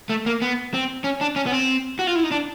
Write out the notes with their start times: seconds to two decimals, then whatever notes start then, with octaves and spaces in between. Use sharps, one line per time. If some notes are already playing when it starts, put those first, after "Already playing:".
0.09 A3
0.26 A#3
0.42 B3
0.74 C4
1.04 C#4
1.21 D4
1.36 C#4
1.46 B3
1.52 C4
1.99 F#4
2.07 F4
2.15 E4
2.23 D#4
2.31 D4